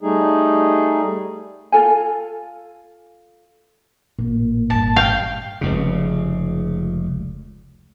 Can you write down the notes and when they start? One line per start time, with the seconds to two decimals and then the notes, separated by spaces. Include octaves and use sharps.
0.02 G3 A3 D#4 G#4
1.72 F4 A4 G#5
4.19 A1 A#2
4.70 G#1 G2 A5
4.96 F5 G5
5.61 F1 C#2 C#3